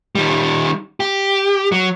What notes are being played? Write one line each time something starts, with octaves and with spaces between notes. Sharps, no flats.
D#3 G3
G4
F#3